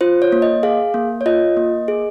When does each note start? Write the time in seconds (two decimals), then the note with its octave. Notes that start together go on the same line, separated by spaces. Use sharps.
0.01 F4 C5
0.22 C#5
0.32 A#3
0.42 D#5
0.63 G#4 F5
0.94 A#3
1.21 C#5
1.26 F4 D#5
1.57 A#3
1.88 G#4